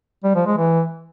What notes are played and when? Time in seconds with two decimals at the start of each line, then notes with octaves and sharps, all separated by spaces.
0.24 G3
0.35 F3
0.46 G#3
0.58 E3